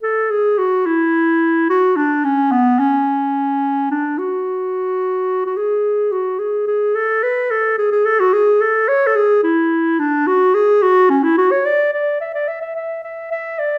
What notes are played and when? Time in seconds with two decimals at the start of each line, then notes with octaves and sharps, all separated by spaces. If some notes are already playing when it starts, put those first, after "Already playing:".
0.03 A4
0.31 G#4
0.58 F#4
0.86 E4
1.70 F#4
1.96 D4
2.25 C#4
2.52 B3
2.79 C#4
3.91 D4
4.18 F#4
5.46 F#4
5.57 G#4
6.12 F#4
6.39 G#4
6.67 G#4
6.95 A4
7.23 B4
7.51 A4
7.78 G#4
7.92 G#4
8.05 A4
8.20 F#4
8.33 G#4
8.61 A4
8.88 C#5
9.07 A4
9.16 G#4
9.43 E4
9.99 D4
10.27 F#4
10.54 G#4
10.82 F#4
11.10 C#4
11.23 E4
11.38 F#4
11.51 C#5
11.66 D5
11.93 D5
12.21 E5
12.34 D5
12.48 E5
12.62 E5
12.76 E5
13.04 E5
13.31 E5
13.59 D5